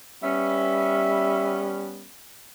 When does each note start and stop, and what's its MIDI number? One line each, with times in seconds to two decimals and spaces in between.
0.23 2.06 55
0.23 2.07 59
0.23 2.07 61
0.23 1.69 76